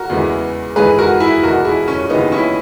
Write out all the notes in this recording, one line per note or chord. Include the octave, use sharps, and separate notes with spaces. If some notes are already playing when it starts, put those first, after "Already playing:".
Already playing: F#4 A#4
E2 C#3 E3 G#3
G#2 E3 G#3 G#4 B4
F#4 A#4
E4 G#4
E2 B2 G#3 F#4 A#4
E4 G#4
C#4
D#2 C#3 E3 G#3 B3 D#4
C#4 E4